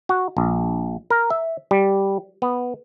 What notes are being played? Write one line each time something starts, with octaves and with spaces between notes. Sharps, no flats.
F#4
A#1
A#4
E5
G3
B3